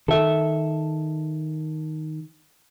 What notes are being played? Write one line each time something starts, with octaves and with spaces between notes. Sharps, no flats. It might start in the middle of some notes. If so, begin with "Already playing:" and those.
D#3 A4 E5